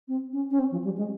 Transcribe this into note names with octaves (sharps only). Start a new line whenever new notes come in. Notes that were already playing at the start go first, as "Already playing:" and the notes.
C4
C#4
C#4
C4
F3
G3
G#3